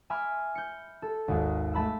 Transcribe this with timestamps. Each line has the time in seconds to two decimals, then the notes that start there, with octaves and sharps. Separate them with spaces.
0.10 E5 G#5 B5 C6 D6 F6
0.55 G6 C#7
1.02 A4
1.28 G#1 D#2
1.73 A3 A5 B5 E6